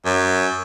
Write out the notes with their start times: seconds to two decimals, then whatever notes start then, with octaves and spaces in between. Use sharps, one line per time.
0.05 F#2